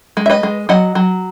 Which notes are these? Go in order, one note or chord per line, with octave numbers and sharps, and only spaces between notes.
G#3
E5
B4 D#5
G#3
F#3 D#5 F#5
F#3